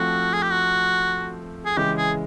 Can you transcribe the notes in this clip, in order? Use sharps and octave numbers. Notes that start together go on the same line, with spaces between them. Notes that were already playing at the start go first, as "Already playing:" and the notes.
Already playing: F3 A3 C4 F#4
G#4
G4
F#4
G#4
C#3 E3 G#3 G4
G#4